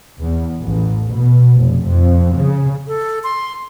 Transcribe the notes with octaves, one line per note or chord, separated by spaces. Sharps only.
E2
A1
B2
F1
F2
C#3
A4
C6